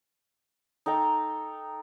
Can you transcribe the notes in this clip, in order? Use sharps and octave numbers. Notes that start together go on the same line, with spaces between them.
D#4 A4 G5 A#5